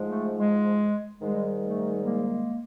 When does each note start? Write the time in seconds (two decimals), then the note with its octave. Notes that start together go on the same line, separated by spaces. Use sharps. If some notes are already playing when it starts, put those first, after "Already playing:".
Already playing: G#2 F3 G#3
0.10 A3
0.38 G#3
1.19 G#2 D#3 G3 G#3
1.61 A3
2.01 G#3 A#3